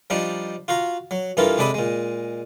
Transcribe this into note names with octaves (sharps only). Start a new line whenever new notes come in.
F3 G3 D4 D#4
F4 F#4 F5 A#5
F#3
G2 E3 E4 F4 A4 A#4
C3 G#3 D4 A4 B5 D#6
A#2 G#3